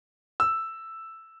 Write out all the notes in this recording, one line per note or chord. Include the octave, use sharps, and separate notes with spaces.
E6